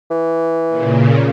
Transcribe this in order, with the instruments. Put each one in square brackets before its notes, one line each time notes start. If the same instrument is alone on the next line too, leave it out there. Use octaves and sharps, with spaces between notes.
[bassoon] E3
[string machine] A#2 C#3